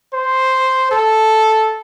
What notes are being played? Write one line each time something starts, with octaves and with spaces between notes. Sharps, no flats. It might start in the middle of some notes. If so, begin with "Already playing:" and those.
C5
A4